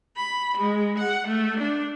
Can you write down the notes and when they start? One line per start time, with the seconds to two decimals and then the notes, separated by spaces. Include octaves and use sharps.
0.17 B5
0.58 G#3
0.99 F#5
1.28 A3
1.61 D4